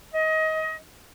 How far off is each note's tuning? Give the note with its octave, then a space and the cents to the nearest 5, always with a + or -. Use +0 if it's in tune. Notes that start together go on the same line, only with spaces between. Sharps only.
D#5 +25